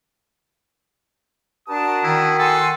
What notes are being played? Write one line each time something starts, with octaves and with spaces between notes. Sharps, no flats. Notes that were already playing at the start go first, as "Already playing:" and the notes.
D4 F#4 A#4 A5 D#6
D#3 E4
A4 F#5 G#5 C6